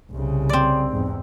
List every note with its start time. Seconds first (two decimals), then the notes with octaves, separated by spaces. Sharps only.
0.11 C2 C#3
0.49 C4 D5
0.90 E2 G#2